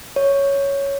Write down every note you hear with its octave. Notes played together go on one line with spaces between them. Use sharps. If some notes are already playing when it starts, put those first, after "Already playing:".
C#5